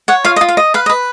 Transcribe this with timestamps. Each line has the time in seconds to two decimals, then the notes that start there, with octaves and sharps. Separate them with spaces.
0.08 C#5 F#5
0.24 F4 F5
0.36 D#5
0.41 F4
0.49 F5
0.57 D#5
0.74 B4 F5
0.86 D#5
0.90 B4